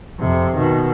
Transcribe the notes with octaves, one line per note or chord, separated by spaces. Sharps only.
F2 C3
B2 D#3